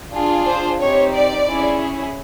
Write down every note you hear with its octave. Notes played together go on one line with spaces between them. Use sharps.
D4 F4 G#4
C5
C4 D#4 G4 C#5
D5
C#4 E4 G#4